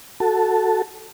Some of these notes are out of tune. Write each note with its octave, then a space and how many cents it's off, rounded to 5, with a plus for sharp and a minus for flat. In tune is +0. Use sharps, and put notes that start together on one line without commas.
F#4 +0 A4 +0 A5 +0